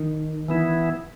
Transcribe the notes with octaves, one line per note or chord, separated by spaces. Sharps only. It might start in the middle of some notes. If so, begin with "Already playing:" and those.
Already playing: D#3
E3 B3 E4